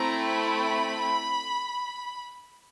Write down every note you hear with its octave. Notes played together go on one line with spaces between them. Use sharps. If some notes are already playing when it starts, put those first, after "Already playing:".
Already playing: A3 C4 E4 A#5
B5